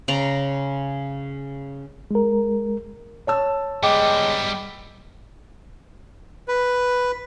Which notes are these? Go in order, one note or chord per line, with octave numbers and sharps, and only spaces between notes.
C#3 D5 A#5 C6
G#3 A#4
C#5 A5 E6
G3 G#3 B3 G5 D6
B4